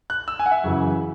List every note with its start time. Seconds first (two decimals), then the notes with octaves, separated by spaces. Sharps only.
0.10 F#6
0.28 E6
0.39 G#5
0.46 F#5
0.51 E5
0.64 F#2 C#3 E3